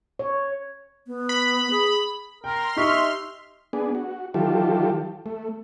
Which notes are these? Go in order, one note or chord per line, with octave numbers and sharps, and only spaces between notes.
C#5
B3
B5
G#4
A#4 G5 C6 F6
D#4 G4 E5 C#6
B3 D4 G#4
F#4
D#3 E3 F#3 F4 G4 A4
A3